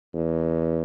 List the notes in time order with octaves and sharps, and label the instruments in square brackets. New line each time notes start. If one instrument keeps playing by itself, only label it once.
[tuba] E2